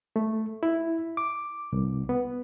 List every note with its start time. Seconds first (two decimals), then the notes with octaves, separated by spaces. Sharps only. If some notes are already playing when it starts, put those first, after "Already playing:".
0.16 A3
0.63 E4
1.17 D6
1.73 C2
2.09 B3